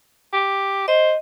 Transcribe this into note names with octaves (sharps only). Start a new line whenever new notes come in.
G4
C5 D#5